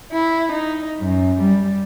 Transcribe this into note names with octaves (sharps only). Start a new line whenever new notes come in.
E4
D#4
F#2
G3